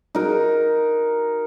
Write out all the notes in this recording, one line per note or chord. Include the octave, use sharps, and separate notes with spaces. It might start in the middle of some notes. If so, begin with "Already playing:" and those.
D#4 F#4 A#4